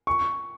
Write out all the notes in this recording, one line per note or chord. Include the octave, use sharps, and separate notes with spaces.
C#6